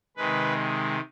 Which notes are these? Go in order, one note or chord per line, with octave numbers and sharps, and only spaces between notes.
C3 D#3 G#3 B4